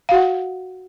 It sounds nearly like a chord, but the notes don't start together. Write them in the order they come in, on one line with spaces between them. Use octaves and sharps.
F5 F#4 F#5